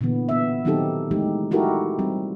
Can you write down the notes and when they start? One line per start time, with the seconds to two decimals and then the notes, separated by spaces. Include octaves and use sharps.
0.01 A#2 D3 E3 B3
0.29 B3 E5
0.65 D#3 F#3 C4 D#4 G4 A4
1.11 E3 G#3 A3 D#4 G4
1.51 D#4 E4 F#4 G4 A4 A#4
1.99 G3 C4